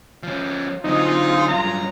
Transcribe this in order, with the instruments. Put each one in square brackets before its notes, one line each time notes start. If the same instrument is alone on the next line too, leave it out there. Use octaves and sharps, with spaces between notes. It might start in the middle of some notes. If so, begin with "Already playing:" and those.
[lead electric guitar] F3 C#4
[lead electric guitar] D3 F#3 [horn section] C4 D#4 [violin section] F4 G#4
[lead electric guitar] G2 F#3 [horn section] A#5